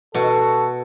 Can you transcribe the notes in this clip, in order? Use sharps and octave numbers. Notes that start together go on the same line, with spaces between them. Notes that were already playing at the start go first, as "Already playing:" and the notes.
B2 F#4 A4